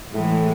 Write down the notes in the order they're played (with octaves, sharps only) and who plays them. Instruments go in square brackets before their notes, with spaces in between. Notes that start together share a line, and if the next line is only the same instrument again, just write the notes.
[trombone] A2 [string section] E3 G#3